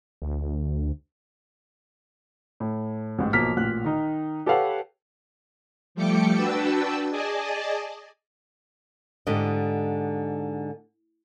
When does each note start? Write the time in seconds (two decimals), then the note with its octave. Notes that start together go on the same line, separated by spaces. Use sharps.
0.22 D2
2.60 A2
3.19 A1 G#2
3.33 B1 F3 A#3 C5 F6 B6
3.57 A1 A#2 F#6
3.84 D#3 D#4
4.46 G4 A4 B4 C#5 F5 F#5
5.95 F3 G3 A3 G5 D6 C#7
6.36 D4 F#4 B4 G5 A5 E6
7.11 G#4 D5 D#5 G#5 A5
9.27 G#2 D3 G4 D#5